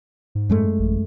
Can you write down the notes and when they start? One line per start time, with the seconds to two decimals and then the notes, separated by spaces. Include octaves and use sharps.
0.35 G#2
0.50 F#2 G#3 A3
0.79 A1